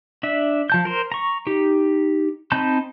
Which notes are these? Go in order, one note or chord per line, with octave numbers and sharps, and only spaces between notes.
D4 E5
F3 A5 G6
A#4 C5
A#5 C#6
D#4 G4
C4 D#4 A5 B5 G6